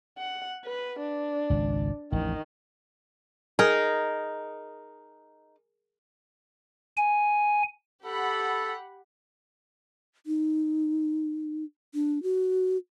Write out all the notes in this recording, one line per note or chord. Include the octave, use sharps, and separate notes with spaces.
F#5
B4
D4
G#1 C#2
A1 E2 D#3 F3
D#4 G#4 A#4
G#5
G4 A4 F#5 B5
D#4
D4
F#4